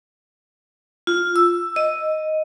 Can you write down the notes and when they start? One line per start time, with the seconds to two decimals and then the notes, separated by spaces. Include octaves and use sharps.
1.07 F4
1.36 E6
1.76 D#5